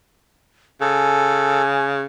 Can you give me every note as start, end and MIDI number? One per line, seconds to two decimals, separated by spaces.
0.81 2.05 49
0.81 1.62 69
0.81 1.83 80